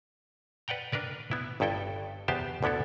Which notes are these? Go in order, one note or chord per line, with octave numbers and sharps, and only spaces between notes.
B4 D5 F#5 G5 A#5
D4 A#4 B4 D5
B3 E4
G1 G2 E4 A4 G5
E2 B3 G4 C5 A5
D2 D3 B3 E4 A4